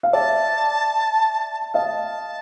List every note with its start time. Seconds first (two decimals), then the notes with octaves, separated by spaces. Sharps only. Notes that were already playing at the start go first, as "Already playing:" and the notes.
0.03 F5
0.13 D5 E5 A5
1.74 D#5 F5 A5